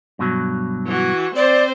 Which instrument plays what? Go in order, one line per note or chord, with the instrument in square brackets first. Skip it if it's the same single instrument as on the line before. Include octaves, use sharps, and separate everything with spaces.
[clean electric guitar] G2 B2 F#3
[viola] E3 F#4
[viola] C4 C5 [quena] D5